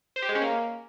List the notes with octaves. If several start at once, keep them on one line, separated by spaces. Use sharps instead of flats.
C5
G4
G#3
C#4
A#3